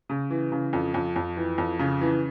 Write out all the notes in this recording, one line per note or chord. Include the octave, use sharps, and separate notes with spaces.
C#3
E3
C#3
F2
F2
F2
E3
F2
C#3
E3